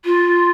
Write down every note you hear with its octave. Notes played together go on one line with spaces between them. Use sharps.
F4